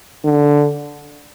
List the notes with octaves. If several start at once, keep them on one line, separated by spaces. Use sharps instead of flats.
D3